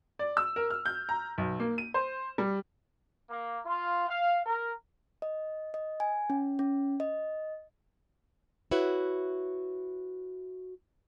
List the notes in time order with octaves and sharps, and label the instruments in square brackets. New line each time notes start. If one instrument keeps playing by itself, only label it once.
[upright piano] D5
E6
A#4
F6
G6
A#5
B1
A#3
D#7
C5
G3
[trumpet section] A#3
F4
F5
A#4
[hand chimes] D#5
D#5
G#5
C#4
C#4
D#5
[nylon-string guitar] E4 F#4 B4 C#5